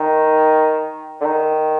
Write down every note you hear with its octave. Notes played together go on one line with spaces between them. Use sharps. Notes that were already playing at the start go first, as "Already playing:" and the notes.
Already playing: D#3
D3
D#3